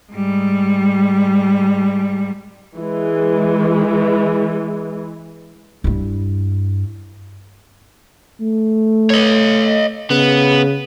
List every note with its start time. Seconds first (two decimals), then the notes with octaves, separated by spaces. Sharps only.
0.12 G#2 G3
2.78 E3 G#3
5.84 G2 E4
8.40 A3
9.10 C#5 D#5
10.11 C#3 B3